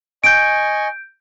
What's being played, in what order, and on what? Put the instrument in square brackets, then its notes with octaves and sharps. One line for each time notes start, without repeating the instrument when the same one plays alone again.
[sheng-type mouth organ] D#5 G#5 C#6 [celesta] G6 D7